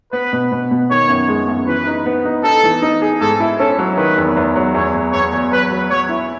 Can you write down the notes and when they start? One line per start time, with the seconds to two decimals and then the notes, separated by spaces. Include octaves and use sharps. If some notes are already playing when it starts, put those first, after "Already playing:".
0.13 B3 B4
0.33 B2
0.52 B2
0.71 B2
0.91 D#3 C#5
1.09 F#2
1.28 G#3
1.48 F#2
1.67 E3 B4
1.87 D#4
2.06 B3
2.25 D#4
2.44 D#4 A4
2.63 E3
2.82 D#4
3.02 G#4
3.21 G#2 A4
3.40 E4
3.60 C#4 A4
3.79 F#3
3.97 D#3 B4
4.17 E2
4.37 E2
4.56 F#3
4.74 E2 C#5
4.94 E2
5.13 E2 C#5
5.33 E2
5.52 F#3 B4
5.71 F#3
5.90 F#3 C#5
6.09 E4